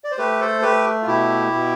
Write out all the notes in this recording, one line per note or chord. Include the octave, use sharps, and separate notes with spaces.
D5
C5
A3 G4 B4
A4 C5
A3 G4 B4
F4
B2 E4 G4
B2